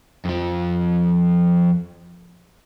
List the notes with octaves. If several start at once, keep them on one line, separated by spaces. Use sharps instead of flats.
F2 F3